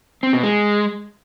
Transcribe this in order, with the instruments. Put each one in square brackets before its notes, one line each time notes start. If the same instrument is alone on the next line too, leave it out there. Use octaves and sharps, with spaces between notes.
[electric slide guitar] C4
B2
G#3